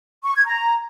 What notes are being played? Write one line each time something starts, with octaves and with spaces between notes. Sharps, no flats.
C#6
G#6
A#5